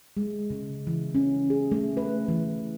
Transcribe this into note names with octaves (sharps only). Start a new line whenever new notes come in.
G#3
C#3
E3
C#4
G#4
A3
B4
E3